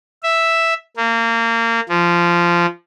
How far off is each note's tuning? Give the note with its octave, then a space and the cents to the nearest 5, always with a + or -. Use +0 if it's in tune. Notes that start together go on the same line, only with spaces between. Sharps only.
E5 +0
A#3 -25
F3 -15